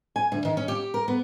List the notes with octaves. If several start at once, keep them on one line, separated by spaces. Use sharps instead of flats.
G#5
D2
D#3
C#4
G4
A#4
B3